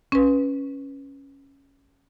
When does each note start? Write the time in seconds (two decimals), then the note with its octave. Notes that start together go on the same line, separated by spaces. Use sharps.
0.12 C#4 B4